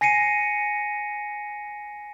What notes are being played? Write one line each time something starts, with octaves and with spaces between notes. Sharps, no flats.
G#5 A#6 C7 C#7 D#7